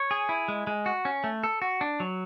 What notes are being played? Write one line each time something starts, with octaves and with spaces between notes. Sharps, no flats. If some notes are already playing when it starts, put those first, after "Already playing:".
Already playing: C#5
G#4
E4
G#3
G#3
F#4
C#4
A3
A4
F#4
D4
F#3